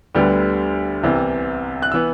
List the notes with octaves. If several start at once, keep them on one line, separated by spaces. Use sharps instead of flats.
D2 D3 G3 B3
C2 C3 E3 B3
F#6
E3 B3 E6